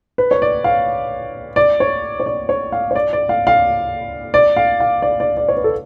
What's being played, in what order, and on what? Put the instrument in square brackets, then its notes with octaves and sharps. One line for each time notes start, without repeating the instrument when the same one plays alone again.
[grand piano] B4
C#5
D5
F5
D5
C#5
C#5
D5
C#5
F5
C#5
D5
D5
F5
F5
D5
F5
F5
D5
D5
D5
C#5
B4
A4